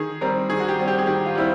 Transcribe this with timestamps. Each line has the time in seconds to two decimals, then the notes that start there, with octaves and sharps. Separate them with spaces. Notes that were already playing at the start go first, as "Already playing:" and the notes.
Already playing: D#3 G#4
0.21 G3 C4 A#4
0.50 D#3 G#4
0.60 F#4
0.68 G4
0.78 G3 C4
0.88 G4
0.99 G#4
1.07 D#3 G4
1.26 F4
1.35 G3 C4 E4